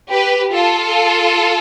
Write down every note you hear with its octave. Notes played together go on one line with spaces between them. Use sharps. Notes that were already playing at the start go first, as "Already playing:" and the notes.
G4 B4
F4 A4